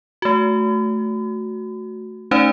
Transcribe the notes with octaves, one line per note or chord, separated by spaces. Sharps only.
A3 F#4
A3 C#4 D#4 C5 D5